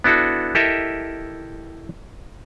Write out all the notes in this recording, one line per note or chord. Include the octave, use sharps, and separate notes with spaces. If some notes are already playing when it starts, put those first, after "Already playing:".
B3 D4 E4 F#4 A4
E4 G4 A4 A#4 D#5 E5